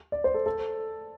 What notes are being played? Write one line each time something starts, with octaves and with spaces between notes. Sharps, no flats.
D5
C5
A4
A4